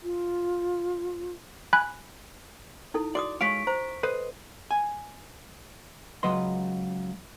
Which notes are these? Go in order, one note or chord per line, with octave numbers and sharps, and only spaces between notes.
F4
G#5 B5 F#6
D#4 E4 A4
F#4 D5 D6 D#6
G#3 C#5 F5 C#6 B6 D7
C5 A#5
A4 B4 C5 D#5
G#5
C#2 F#3 B4 D#5 C6